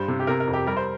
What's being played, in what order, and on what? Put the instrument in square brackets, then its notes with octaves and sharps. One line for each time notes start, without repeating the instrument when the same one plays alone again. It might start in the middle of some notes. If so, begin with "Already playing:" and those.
Already playing: [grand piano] G2 G3 C5
C3
G4
C3 A#4
A#4
F2
G4
G3 A#4
C5